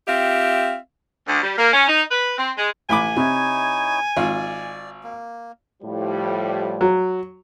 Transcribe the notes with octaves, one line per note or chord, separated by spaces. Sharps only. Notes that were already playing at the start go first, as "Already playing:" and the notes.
C4 F4 G4 E5 F5
D2
G3
A#3
C#4
D#4
B4
C4
G#3
A1 G#5 B5 D6
C3 D#4 E4 C#5
G#1 F4 D5
A#3
A2 F3 G3
F#3